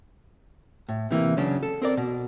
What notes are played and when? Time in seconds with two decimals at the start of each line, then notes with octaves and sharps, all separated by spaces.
0.89 A2
1.11 C3 E3 A#3
1.37 C#3 F#3 C#4 D4
1.63 A4
1.82 C4 A#4 D5
1.97 B2